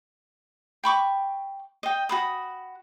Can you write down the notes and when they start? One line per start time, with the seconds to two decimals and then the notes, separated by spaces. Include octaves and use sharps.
0.84 G5 B5 C#6 D6
1.83 D#5 G5
2.09 F#4 B5 D#6